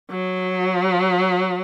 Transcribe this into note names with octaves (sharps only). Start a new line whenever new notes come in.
F#3